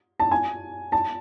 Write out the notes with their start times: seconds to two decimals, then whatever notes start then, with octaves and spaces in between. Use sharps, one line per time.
0.20 A5
0.31 G#5
0.92 A5